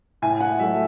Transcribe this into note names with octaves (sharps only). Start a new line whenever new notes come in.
A2 G#5
F#5
F#3 A3 E5